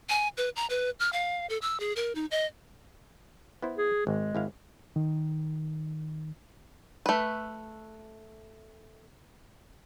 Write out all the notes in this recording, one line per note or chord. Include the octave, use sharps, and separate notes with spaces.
G#5
B4
A#5
B4
F6
F5
A4
E6
G#4
A#4
D#4
D#5
B3 E4 C5
G#4
G#1 G#3
G#1 E4 F5
D#3
A3 B4